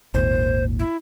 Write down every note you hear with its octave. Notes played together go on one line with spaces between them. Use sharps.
G#1 D#2 A#2 C5
E4